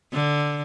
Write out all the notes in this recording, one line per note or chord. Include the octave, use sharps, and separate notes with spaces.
D3